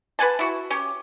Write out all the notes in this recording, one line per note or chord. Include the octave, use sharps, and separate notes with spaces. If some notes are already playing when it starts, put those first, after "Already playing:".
B4 F#5 G#5 A5
E4 F#4
C#4 G4